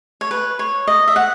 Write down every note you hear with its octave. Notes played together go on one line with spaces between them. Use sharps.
C#5
B4
C#5
D#5
E5
F#5